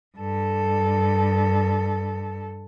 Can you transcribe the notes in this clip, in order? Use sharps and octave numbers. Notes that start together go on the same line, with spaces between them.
G2 A4